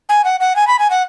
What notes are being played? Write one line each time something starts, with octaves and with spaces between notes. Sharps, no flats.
G#5
F#5
F#5
G#5
B5
G#5
F#5